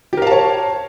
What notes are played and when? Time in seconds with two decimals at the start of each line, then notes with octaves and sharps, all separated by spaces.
0.13 G4
0.17 A#4
0.22 F5
0.27 A5
0.31 C#5